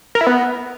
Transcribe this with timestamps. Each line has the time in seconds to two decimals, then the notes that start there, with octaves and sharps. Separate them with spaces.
0.15 A#4
0.21 E4
0.27 B3